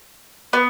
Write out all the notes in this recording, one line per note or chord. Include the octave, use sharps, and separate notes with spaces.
B3